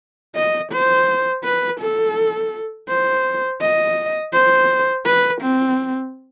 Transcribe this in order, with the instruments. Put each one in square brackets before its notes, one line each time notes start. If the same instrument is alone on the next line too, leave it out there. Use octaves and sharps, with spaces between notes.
[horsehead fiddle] D#5
C5
B4
A4
C5
D#5
C5
B4
C4